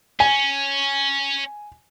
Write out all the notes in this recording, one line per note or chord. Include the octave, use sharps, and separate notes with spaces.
C#4 G#5